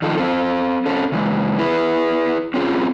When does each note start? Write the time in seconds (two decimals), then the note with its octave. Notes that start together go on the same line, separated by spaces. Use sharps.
0.02 D#3 F3 A4
0.18 C4 A4
0.86 C4 C#4 A4
1.12 C#3 E3 G#3
1.59 E4 G#4 B4
2.54 C4 C#4 F4 G#4